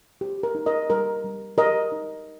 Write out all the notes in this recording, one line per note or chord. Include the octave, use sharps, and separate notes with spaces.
G4
A#4
D#4
A#4 D#5
G3 A#4
G3
G4 A#4 D#5
D#4